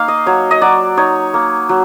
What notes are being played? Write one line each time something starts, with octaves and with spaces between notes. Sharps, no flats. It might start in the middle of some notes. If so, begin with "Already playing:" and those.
Already playing: A#3 D#4 F5
D#5
F#3 C#5
D#5
F#3 D5
D#4 C#5
A#3
F#3